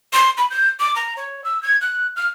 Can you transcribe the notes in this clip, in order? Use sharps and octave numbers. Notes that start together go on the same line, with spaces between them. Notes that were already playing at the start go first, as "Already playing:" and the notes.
C6
B5
G6
D6
A#5
C#5
E6
G#6
F#6
F6